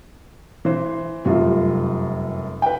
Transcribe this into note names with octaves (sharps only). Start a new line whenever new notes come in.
E3 C5
F1 F#2 G3 F4
B4 G5